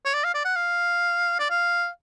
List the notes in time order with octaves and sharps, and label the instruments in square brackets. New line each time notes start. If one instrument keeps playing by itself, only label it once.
[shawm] C#5
D5
F5
D5
F#5
F5
D5
F5